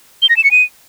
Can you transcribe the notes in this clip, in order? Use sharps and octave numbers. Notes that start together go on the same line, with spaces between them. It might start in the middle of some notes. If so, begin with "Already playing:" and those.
G7
A#6
E7
C#7
D#7